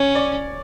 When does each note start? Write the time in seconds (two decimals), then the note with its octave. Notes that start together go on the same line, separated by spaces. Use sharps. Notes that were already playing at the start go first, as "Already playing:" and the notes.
Already playing: C#4 C#5
0.15 D5